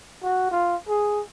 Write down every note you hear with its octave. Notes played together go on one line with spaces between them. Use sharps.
F#4
F4
G#4